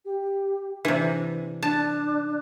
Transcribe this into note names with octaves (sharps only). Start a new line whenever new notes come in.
G4
C3 E3 D4
D4 A5